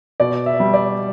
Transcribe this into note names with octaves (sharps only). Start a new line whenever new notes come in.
B2 D5
E5
G3
D5